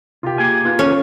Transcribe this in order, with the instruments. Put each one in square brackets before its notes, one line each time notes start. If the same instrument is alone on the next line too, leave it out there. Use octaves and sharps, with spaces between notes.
[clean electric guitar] C3 [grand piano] F4 G4
[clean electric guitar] A#3 G#4 G#5
[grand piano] B3 F4 F#6
[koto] C#4